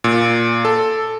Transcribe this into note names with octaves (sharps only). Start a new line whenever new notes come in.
A#2
A4